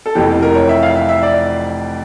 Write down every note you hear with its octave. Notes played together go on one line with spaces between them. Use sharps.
A4
F1 F2 E3 G4
A#4
C#5
E5
F5
E5
E5
D5